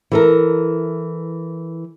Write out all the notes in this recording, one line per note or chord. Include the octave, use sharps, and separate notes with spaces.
E3 A4 A#4